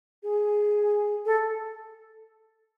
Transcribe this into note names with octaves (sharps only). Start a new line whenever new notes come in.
G#4
A4